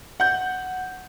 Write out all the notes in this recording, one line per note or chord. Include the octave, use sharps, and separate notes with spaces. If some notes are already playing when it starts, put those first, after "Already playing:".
F#5 G6